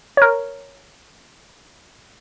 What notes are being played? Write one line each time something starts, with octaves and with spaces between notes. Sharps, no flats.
A#4 C#5